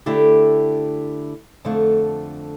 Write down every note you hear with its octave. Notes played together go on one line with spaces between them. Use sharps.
D3 A3 E4 G4
F2 D3 A3